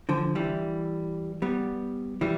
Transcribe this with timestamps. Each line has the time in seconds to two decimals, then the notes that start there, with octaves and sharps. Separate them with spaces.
0.09 D3 F3
0.35 E3 G3
1.42 G3 B3
2.21 E3 G3